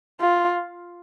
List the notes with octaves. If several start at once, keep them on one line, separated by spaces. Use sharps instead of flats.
F4